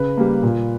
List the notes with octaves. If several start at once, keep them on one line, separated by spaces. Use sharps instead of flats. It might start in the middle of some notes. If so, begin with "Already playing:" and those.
Already playing: C#3 B4
G3 A#3
A#2